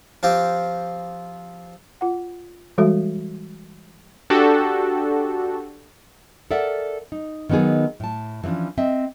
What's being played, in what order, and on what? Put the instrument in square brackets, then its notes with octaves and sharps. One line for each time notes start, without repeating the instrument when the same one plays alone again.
[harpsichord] F3 C4 F4 G4
[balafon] F4 F#5
E3 G3 G#3 F#4 A4 E5
[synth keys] D4 F#4 G4 A4
[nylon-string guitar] A4 A#4 D5 E5 F#5
D#4
D#3 F#3 B3 D#4 G#4
A2 A5
E3 F3 G3 C#4 D4
C4 D#5 E5